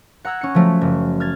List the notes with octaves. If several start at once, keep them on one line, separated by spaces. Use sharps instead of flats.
F#5 A#5 E6 G#6
C#4 C#7
F3 F#3 A3
F#1
F6 G#6 A6